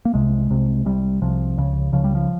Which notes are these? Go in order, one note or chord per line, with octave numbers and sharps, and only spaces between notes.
A#3
C2 C3 G#3
C2 C3
C2 C3 G3
C2 C3 F3
C#2 C#3
C#2 C#3 F3
G3
F3